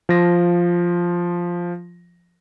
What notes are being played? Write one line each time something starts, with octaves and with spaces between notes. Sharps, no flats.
F3 A#6